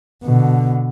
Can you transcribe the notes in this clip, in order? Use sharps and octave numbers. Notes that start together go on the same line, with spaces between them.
B2 D3